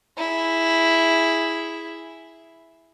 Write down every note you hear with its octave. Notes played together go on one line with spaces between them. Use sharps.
E4 G#4